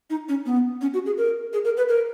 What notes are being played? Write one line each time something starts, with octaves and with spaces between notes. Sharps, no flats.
D#4
C#4
B3
C#4
F#4
G#4
A#4
G#4
A#4
B4
A#4